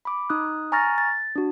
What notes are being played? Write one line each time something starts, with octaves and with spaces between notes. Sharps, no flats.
B5 D6
D#4 D#6 F#6
G#5 A#5 C#6 F6 A6 A#6
A6
D4 F#4